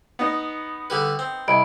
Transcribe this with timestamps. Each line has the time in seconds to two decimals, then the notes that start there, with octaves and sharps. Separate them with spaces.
0.19 B3 D#4
0.90 D3 G3 B4
1.19 C4
1.48 C2 D#5 B5 D7